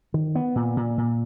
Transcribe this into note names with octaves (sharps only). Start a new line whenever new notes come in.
D#3
B3
A#2
A#2
A#2